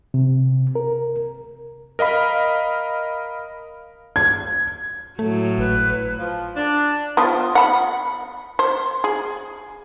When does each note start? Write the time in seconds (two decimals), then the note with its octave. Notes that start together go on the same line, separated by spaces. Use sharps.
0.14 C3
0.75 A#4
1.99 A#4 D#5 F5 B5
4.16 G#6
5.19 A2 F#3 A3
5.58 G#1 B4
6.18 F3
6.57 D4
7.17 F3 B3
7.55 F#5 B5
8.59 C5
9.04 G#4